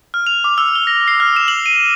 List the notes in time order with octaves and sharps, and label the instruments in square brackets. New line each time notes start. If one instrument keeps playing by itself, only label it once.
[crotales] F6
F7
D6
E6
G7
A#6
C7
F6
E7
F#7
D#7